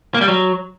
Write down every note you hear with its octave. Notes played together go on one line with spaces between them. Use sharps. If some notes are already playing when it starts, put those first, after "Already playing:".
A#3
G3
F#3